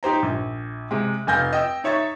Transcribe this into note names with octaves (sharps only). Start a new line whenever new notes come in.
D#4 G4 C5 A#5
A#1
C3 G#3
F1 F5 G#5 F6 G6 A#6
D#5 G5 E6
D#4 C#5 E5 C#6 A6